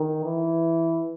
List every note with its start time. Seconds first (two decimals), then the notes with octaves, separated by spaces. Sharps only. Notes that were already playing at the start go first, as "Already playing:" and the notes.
Already playing: D#3
0.25 E3